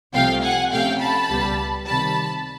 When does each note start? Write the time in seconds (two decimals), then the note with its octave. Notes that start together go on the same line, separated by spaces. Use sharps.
0.14 C2 C3 F3 A3 F5 G5
0.43 F#5 G#5
0.72 C3 F3 A3 C#4 F5 G5
1.01 A5 B5
1.29 C#2 B2 G3 B3
1.87 C3 D#3 G3 A5 B5